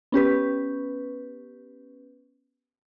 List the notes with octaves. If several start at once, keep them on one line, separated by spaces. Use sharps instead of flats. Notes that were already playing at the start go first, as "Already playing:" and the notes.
B3 C#4 G4 B4